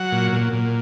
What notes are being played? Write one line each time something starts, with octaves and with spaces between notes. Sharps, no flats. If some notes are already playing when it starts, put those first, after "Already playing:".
Already playing: F#3 F#5
A#2
A#2
A#2